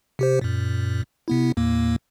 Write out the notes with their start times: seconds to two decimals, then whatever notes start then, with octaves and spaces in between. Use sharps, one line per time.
0.19 C3 G4 C5
0.41 F#2 A#2
1.28 C3 B3 E4
1.57 D#2 A2 A#3